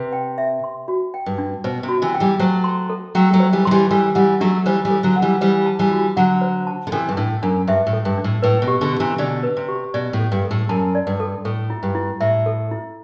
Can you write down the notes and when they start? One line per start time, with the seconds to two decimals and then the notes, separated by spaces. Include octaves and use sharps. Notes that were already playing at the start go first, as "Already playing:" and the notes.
Already playing: C3 B4
0.13 G5
0.38 E5
0.64 C6
0.88 F#4
1.14 G5
1.26 G2
1.38 D4
1.64 B2 C5
1.83 C3
1.89 F#4
2.02 C3 E3
2.14 G5
2.20 E3 G3
2.39 F#3 A3 C5
2.64 C6
2.90 A4
3.15 F#3 A3 G5
3.33 F#3 A3
3.40 C5
3.53 E3 G3
3.65 F#3 C6
3.71 E3 G3
3.91 E3 G3 A4
4.15 E3 G3 F#5
4.40 F#3 A3 D4
4.66 E3 G3 C5
4.85 E3 G3
4.91 A4
5.03 D3 F#3
5.16 F#5
5.22 E3 G3
5.41 E3 G3 C5
5.66 A5
5.79 E3 G3
5.92 F#4
6.17 D3 F#3 F#5
6.41 C5
6.67 A5
6.87 D3
6.92 C3 E3 A4
7.09 G2
7.17 A2 D4
7.42 F#2 D4
7.67 G2 E5
7.87 A2
7.93 A4
8.05 G2
8.18 D4
8.24 A2
8.42 A2 B4
8.62 B2
8.68 G4
8.81 B2 D3
8.93 G4
9.00 C3 E3
9.18 B2 D3 D5
9.43 B4
9.57 C3
9.69 G4
9.94 B2 D5
10.13 A2
10.19 A4
10.32 G2
10.44 A4
10.51 A2
10.69 F#2 A5
10.95 D5
11.07 G2
11.20 A4
11.45 A2 A4
11.70 E4
11.83 G2
11.95 E4
12.21 A2 E5
12.46 A4
12.71 E4